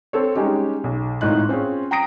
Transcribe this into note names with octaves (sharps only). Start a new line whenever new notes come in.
C4 A4 C#5
G3 G#3 C#4 D#4 G4
B1
G#1 A2 D#4 F4 F#6
C4 C#4 F4 G#4
G5 A#5 D#6 A#6 D7